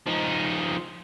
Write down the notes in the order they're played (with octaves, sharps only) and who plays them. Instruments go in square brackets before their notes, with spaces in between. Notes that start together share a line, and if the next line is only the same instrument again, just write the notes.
[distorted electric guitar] F3 D#4